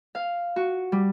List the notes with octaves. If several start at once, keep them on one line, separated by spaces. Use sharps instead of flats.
F5
F#4
G3